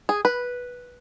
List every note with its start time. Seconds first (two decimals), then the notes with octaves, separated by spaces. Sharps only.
0.09 G#4
0.25 B4